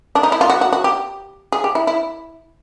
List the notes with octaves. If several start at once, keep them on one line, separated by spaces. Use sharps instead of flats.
D4
D#4
E4
F4
F#4
F#4
F#4
G4
G#4
G4
E4
E4